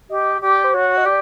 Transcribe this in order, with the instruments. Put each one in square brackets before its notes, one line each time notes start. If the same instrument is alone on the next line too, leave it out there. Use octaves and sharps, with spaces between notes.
[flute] G4 [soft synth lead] D#5
[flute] G4 [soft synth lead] D5
[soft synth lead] C5
[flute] F#4 [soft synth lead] C#5
[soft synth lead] D#5
[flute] G4 [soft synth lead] D5